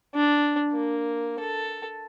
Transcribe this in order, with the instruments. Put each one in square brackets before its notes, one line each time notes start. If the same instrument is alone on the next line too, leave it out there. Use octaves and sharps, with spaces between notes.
[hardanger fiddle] D4
A#3
A4